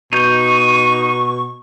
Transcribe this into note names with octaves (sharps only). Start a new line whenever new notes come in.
B2 D#4 C#6 G6